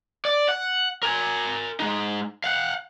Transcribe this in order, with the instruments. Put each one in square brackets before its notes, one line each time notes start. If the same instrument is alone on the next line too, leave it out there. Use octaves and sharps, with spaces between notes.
[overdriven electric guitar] D5
F#5
A#4 G#5
G#3 D#4
F5 F#5